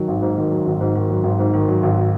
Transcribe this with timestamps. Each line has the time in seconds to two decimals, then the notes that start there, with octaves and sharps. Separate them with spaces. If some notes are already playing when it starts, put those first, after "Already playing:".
Already playing: D#3 F#3
0.08 G#1
0.22 G#2
0.38 D#3
0.51 F#3
0.66 G#1
0.81 G#2
0.95 D#3
1.10 F#3
1.24 G#1
1.39 G#2
1.54 D#3
1.68 F#3
1.83 G#1